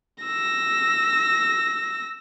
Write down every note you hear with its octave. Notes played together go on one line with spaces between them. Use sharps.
E6 A#6